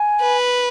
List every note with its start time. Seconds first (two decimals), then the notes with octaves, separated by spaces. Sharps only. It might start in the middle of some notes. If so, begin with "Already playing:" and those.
Already playing: G#5
0.21 B4